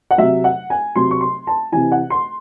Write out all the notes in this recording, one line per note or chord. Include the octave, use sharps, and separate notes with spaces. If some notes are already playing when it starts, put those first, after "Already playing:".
F#5
C3 F#3 E5
F#5
G#5
C3 F#3 C6
C#6
C6
A5
C3 E3 G#5
F#5
C6